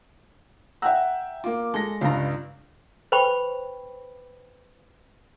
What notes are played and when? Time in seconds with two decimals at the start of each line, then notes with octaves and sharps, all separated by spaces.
0.82 E5 F#5 G5 A#5 E6
1.44 A#3 F4 D6
1.74 G#3 A4 A#6
2.01 C#2 G2 F4 A#5
3.12 B4 C5 G5 B5 C#6